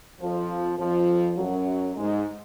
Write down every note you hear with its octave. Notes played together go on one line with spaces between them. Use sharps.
F2 F3
F2 F3
F#2 F#3
G#2 G#3